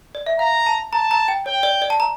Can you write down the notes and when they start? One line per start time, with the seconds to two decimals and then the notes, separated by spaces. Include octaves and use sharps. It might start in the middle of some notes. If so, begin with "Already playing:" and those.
0.15 D5
0.26 E5
0.39 F5 A#5
0.66 A5
0.93 A5 A#5
1.11 A#5
1.28 G5
1.46 C#5 G5
1.63 D5
1.82 D5
1.90 A5
2.00 A#5